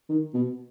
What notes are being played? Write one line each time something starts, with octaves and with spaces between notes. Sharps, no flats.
D#3
B2